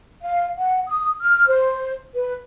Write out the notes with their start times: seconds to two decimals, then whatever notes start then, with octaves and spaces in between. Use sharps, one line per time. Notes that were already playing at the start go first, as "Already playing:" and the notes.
0.22 F5
0.57 F#5
0.88 D#6
1.21 F6
1.48 C5
2.15 B4